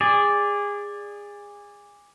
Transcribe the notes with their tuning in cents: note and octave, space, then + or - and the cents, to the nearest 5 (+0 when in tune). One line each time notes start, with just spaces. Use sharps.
G#4 -25 D5 +0